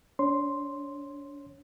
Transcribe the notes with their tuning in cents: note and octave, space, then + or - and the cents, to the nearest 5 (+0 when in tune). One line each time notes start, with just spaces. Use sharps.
D4 -35 C#5 -20 C6 +0